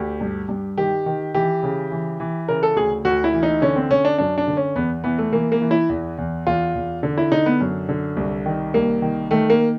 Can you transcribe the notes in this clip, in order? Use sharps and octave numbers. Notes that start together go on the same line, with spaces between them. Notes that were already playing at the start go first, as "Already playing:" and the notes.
Already playing: D2 G4
G2
G2
D#3 G4
D#3
E3 G4
C#3
E3
E3
C#3 A#4
A4
D2 G#4
D2 F#4
E4
E3
D#4
D3 C#4
C4
D3 C#4
D4
F#2 D4
D4
D3
C#4
E2 B3
E3 B3
A3
E3 A#3
A#3
E3
E4
E2
E2
E2 F4
E2
D3
E4
D3 D#4
B3
F#2
D3
C2
D#3
C2 A#3
D#3
D#3 A3
A#3